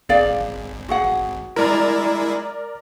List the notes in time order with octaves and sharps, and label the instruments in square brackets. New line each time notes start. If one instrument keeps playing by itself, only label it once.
[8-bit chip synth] G#1 [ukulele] G#4 D5 F5
[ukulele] F#4 G#4 F#5
[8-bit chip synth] G#3 E4 [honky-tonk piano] A#4 D5 A#5